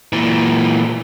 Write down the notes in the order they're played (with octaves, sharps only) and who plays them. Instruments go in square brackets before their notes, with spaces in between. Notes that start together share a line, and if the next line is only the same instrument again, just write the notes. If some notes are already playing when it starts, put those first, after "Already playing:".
[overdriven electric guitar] A#2 E3